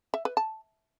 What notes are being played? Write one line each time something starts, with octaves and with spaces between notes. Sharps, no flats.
E5
B4
A5